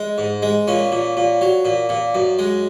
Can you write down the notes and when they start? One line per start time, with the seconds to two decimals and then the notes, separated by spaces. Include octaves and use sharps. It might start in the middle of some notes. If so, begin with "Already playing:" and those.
Already playing: G#3
0.18 G#2
0.42 G#3
0.67 A#2 C#4
0.92 A#2
1.17 A#2
1.41 F#3
1.65 A#2
1.89 A#2
2.15 F#2
2.39 G#3